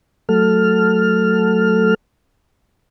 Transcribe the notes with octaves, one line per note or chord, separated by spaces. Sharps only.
F#3 A3 A4 F6